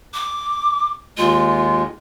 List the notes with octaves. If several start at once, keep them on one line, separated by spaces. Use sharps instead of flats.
D6
D#2 G#3 F4